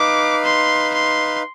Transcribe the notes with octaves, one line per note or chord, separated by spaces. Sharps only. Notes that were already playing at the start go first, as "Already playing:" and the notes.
Already playing: D#4 B4 F5 D6
C6
C6